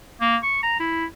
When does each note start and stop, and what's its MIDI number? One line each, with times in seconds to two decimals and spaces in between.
0.21 0.37 58
0.43 0.60 85
0.63 0.77 82
0.80 1.05 64